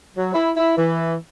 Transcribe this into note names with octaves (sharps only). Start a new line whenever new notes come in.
F#3
E4
E4
E3